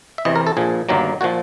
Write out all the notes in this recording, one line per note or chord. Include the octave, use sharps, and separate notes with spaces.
E5
E2 C3 E3 D#5
A#4
A4
A#1 A#2 F3 G#4
G1 G2 D#3 F#3 A#3
A#2 F3 F#4